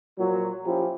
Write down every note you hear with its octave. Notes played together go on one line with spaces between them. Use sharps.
A#2 F3 F#3
F3 C#4 E4 F4 G4